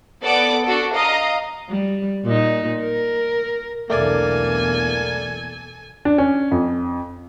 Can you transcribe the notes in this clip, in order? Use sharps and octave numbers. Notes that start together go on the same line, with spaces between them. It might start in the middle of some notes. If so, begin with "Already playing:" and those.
B3 A4 D5 F#5 D6
D4 F#4 A4
D#5 F5 A#5 D#6
G3
A#2 D#4
A#4
B1 E2 A3 A#3 D4 A4 D5 G#5
D4
C#4
F2